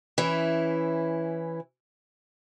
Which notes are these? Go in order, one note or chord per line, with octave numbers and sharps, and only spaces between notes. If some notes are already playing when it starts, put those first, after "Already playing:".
E3 C#4 E4